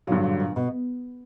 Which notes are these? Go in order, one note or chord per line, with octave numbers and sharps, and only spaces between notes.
G2 A#2 D3 F#3
A#2
A#2
B2